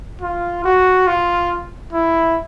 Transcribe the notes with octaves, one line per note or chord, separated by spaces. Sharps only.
F4
F#4
F4
E4